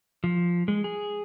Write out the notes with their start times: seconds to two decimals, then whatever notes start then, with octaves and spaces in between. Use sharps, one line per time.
0.24 F3
0.68 G#3
0.84 G#4